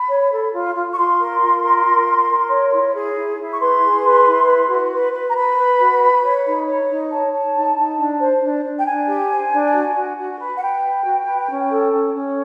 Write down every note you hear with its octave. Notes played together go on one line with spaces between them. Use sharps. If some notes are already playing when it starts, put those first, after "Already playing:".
Already playing: B5
C#5
A4
F4
F4
C#6
F4 C6
A#4
F4
A#4
F4
A#4
A#4
C#5
E4
G#4
E4
E4
C#6
B4 C6
G#4
B4
E4
B4
F#4
B4
B4
A#5
B4 B5
B4
F#4
B4
C#5
D#4
C#5
D#4
C#5 A5
C#5
D#4
D#4
D4
C5
D4
D4
G5
D4 G#5
G4
C5
D4
F#4
F#4
F#4
B4
F#5
B4 G5
B4
F#4
B4
C#4
A4
C#4
C#4